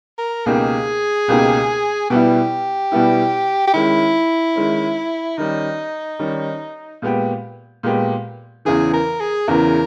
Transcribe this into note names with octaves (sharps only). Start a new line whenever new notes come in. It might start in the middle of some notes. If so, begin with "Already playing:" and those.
A#4
C#2 B2 A#3 D#4 G4 G#4
C#2 B2 A#3 D#4 G4
B2 G3 B3 E4 G4
B2 G3 B3 E4
G4
D#3 G#3 C#4 E4
D#3 G#3 C#4
D#3 G3 C#4 D#4
D#3 G3 C#4
A#2 G#3 B3 G4
A#2 G#3 B3 G4
E2 C#3 E3 G#4
A#4
G#4
E2 C#3 E3 A#4